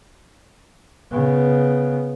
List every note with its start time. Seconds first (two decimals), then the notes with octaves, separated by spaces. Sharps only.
1.12 C#3 B3